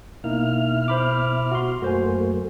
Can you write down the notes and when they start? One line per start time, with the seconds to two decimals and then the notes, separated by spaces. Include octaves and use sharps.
0.24 B2 A#3 D#4 E4 F6
0.88 C5 B5 D6
1.52 F#4 C6
1.82 F#2 A3 A#3 F#4 C5 G#5